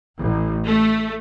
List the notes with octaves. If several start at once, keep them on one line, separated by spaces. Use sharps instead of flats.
A1
A3